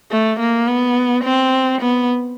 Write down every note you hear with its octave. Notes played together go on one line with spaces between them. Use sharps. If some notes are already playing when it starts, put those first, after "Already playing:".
A3
A#3
B3
C4
B3